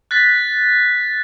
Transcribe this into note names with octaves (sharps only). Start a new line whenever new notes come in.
F#6 A6 B6